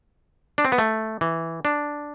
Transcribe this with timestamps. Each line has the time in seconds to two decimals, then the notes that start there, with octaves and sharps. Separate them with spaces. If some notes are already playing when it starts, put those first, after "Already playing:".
0.58 D4
0.65 C4
0.72 B3
0.78 A3
1.21 E3
1.65 D4